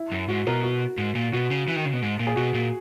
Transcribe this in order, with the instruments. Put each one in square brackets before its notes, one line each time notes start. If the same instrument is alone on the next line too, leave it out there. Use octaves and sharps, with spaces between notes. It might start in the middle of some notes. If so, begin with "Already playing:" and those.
Already playing: [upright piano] E4
[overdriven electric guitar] F#2
[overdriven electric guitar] G#2 [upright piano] F#4
[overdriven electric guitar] B2 [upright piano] A#4
[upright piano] F#4
[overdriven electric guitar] G#2
A#2
[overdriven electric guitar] B2 [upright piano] F#4
[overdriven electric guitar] C#3
E3
D#3
C#3
B2
G#2
A#2
[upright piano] G#4
[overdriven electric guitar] B2 [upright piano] F#4
[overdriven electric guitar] A#2